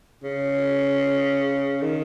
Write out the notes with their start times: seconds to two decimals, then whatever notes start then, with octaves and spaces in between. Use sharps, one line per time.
0.24 C#3
1.82 D#3